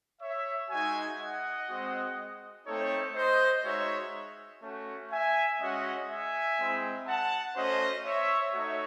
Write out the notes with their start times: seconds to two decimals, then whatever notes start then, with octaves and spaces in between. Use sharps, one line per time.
0.21 C#5 E5
0.70 G#3 D#4 F#4 E5 G#5
1.19 D#5 F#5
1.69 G#3 C4 F#4
2.66 A3 C4 D#4 A4 C#5
3.15 C5 D#5
3.64 G#3 D#4 F#4 C#5 E5
4.62 A3 C#4 F#4
5.11 E5 G#5
5.60 G#3 C#4 F#4 D#5 F#5
6.09 E5 G#5
6.58 G#3 C4 E4
7.07 F#5 A5
7.56 A3 C#4 F#4 C5 D#5
8.05 C#5 E5
8.54 A3 D#4 F#4 C#5 E5